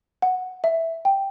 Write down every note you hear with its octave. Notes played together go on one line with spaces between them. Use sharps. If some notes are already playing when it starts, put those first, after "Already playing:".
F#5
E5
G5